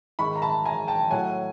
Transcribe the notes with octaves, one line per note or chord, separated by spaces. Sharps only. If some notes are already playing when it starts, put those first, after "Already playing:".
G#2 D#3 G#3 B5 C#6
A#5
A5 B5
G#5 A#5
G5 A5
A2 F#3 F#5 G#5